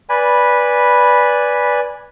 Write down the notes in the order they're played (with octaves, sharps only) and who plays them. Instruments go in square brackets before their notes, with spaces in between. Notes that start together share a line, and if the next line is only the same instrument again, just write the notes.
[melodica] B4 D5 G#5 B5